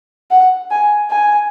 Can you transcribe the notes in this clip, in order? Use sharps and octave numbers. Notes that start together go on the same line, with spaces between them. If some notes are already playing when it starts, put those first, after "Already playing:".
F#5
G#5
G#5